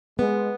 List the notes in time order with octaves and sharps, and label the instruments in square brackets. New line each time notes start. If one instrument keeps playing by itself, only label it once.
[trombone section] G#3 [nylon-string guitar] B3